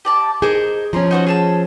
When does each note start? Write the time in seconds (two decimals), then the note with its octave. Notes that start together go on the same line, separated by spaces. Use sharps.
0.05 G4 D5 A5
0.42 D#4 G#4 A#4 C5
0.93 F3 C#4 A#5 C6
1.11 D#4 F#4 C5
1.27 G#4 A5 E6